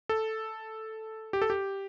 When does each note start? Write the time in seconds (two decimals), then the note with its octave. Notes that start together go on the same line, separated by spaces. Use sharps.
0.09 A4
1.33 G4
1.42 A4
1.50 G4